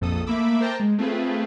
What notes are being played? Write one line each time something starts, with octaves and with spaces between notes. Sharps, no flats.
A#1 F2 A4 D#6
A3 A#3 E5 B5 D6 E6
A#4 C5 G5 A5 A#5 D6
G#3
A3 C4 F4 G#4 B4